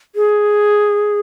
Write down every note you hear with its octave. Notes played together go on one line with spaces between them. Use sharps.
G#4